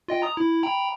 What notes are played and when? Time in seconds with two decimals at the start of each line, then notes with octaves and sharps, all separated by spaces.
0.08 F4 D#5 G5
0.22 A#5 D#6
0.37 E4
0.63 G5 A#5 B5